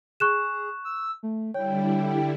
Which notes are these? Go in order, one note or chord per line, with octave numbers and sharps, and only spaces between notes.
G#4 C#6 F#6 E7
E6
A3
D3 G3 E4 C#5 G5